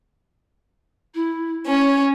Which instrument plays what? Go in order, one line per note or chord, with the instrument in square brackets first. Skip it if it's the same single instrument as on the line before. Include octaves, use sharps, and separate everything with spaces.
[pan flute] E4
[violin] C#4 [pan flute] C#5